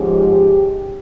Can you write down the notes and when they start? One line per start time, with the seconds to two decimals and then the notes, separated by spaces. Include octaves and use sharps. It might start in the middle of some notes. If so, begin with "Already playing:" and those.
Already playing: G#2 F3 G#3 C#4 G4